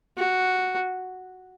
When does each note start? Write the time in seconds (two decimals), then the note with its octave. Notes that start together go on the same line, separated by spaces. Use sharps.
0.17 F#4